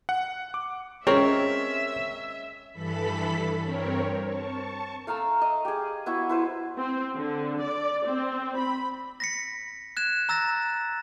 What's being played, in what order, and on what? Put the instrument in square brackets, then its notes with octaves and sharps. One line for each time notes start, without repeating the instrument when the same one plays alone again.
[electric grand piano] F#5
D6
[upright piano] G#3 C#4 [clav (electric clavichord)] C4 A#4 [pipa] C#5 [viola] E5
[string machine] G2 E3 A4 B5 B6
G2 C4 A#4 C#5
A5 C#6
[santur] A3 F5 A#5 E6
D#5
G4 G#4
B3 E4 F#4
E4 B4 C5
[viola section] C4
D3
D5
C4
B5
[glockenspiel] A#6 B6 C#7
F#6 G#6 E7
A#5 E6 A6 A#6